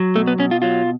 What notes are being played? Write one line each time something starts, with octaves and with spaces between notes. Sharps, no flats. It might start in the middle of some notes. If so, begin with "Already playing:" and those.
Already playing: F#3
B2 A3
B3
B2 C#4
F4
F#3 F4